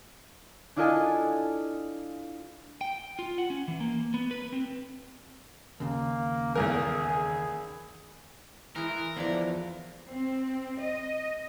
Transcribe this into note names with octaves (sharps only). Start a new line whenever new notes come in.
D4 E4 F4 A4 D#5 G#5
G5
F4
F#5
C#4
E3
A#3
B3
B4
C4
D#2 C#3 A#3
B1 E2 G#4 A#4
E3 G#3 E4 A#4
E2 D3 F3 E4 D5
C4
D#5